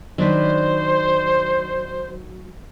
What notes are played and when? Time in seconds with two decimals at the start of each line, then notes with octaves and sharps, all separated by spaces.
0.18 D#3 F#3 D4 B4 C5